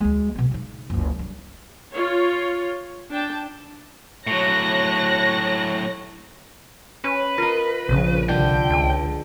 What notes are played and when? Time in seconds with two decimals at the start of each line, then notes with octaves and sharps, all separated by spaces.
0.01 D2 G#3
0.35 B2 C4
0.51 C#3 D#4
0.90 F#1 C#2
1.19 G3 D4
1.92 F4 C#5
3.10 D4 G5 A5
4.27 A2 F#3 C#5 F#6 A#6
7.04 C#4 B4
7.38 F4 A#4 D#5
7.89 A#1 C#3 F3
8.29 C2 D3 F3 G5
8.70 C#2 G#3